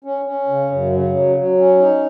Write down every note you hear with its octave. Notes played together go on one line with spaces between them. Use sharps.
C#4
C#4
C#3
F#2
C#3
F#3
F#3
C#4
D#4